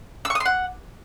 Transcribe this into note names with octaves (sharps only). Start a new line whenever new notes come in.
E6
C#6
D#6
C6
F#5